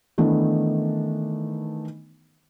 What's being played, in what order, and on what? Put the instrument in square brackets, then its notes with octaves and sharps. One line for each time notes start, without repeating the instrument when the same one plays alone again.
[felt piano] D#3 E3 A3 B3 D4 D#4